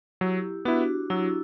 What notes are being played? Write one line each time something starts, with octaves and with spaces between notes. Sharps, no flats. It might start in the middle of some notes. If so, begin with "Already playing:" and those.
F#3 E4 G4
B3 D4 E4 F#4
F#3 E4